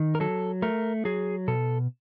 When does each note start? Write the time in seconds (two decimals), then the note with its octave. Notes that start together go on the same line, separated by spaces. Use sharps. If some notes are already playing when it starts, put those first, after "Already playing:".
Already playing: D#3
0.15 A#4
0.20 F#3 A4
0.62 A3 A#4
1.05 F#3 G#4
1.48 B2 A4